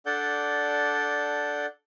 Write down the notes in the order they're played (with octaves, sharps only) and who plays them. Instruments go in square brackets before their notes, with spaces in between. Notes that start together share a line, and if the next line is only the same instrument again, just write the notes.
[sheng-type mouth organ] D4 A4 D5 F#5 G6